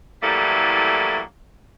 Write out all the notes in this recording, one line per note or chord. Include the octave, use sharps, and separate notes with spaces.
A2 E3 F#3 G3 A3 A#3